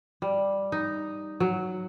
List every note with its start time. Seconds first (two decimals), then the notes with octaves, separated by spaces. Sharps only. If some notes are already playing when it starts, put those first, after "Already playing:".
0.22 G3
0.72 D#4
1.40 F#3